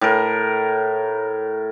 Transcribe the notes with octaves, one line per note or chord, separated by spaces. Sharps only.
A2 A#4